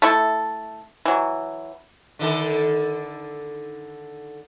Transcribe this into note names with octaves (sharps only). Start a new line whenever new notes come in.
A3 E4 A4
E3 F#3
D3 D#3 A4